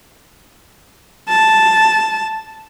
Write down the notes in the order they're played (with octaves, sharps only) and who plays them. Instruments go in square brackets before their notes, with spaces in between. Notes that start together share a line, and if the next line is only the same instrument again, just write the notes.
[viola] A5